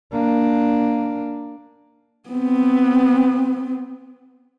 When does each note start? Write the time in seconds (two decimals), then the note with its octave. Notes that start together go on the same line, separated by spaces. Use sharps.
0.13 A#3 D4
2.29 B3 C4